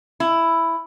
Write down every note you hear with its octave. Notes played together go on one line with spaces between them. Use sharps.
E4